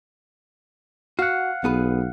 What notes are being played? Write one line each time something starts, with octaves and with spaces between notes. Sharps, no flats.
F#4 F5 F#5
B1 B3 G#4 B4